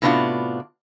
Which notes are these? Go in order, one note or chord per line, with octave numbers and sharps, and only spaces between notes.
A2 C3 B3 D4 F4 F#4